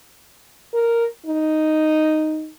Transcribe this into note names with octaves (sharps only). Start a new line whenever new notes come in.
A#4
D#4